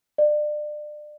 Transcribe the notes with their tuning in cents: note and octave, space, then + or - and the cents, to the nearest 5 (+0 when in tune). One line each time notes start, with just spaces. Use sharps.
D5 +30